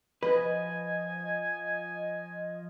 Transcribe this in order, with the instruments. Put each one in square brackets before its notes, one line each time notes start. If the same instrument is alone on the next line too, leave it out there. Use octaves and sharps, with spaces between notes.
[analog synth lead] F3 [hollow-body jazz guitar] B4 [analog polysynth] D#5 [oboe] G#5